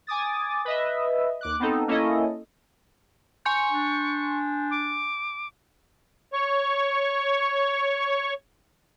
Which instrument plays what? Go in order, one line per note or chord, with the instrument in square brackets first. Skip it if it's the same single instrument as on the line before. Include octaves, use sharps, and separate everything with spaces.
[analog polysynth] G#5 D6 D#6 A6
B4 D#5 E5
D#2 D6 F#6
B3 C4 D#4 A4
A#3 C#4 E4 A4 D#5
[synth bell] G#5 C6 G6 [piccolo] C#6
[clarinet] D4
[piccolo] D6
[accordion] C#5 C#6